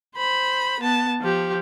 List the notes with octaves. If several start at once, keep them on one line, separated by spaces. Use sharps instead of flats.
C5 B5
B3 A5
F3 G4